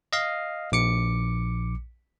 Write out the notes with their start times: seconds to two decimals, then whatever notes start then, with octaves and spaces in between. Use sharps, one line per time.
0.13 D#5 F5
0.72 A#1 D6 C#7